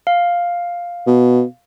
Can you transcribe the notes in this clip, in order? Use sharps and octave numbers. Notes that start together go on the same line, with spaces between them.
F5
B2